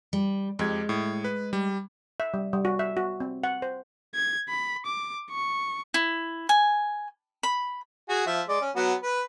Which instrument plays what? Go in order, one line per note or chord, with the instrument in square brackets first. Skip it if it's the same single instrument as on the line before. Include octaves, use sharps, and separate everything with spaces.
[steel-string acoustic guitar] G3
[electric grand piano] F2 G4 G#6 [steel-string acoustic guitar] G#3
[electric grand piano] A2
B4
G3
[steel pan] E5
G3
G3
F#4
E5
F#4
C4
F#5
C5
[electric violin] G#6
B5
D6
C#6
[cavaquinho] E4
G#5
B5
[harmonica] F#4 G#4
F3 E5
G#3 D5
C#4
F#3 B3 F#4
B4